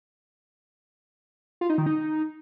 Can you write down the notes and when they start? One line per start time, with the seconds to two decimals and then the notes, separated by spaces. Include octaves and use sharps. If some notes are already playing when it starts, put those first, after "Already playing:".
1.61 F4
1.70 D#4
1.78 D#3
1.86 D#4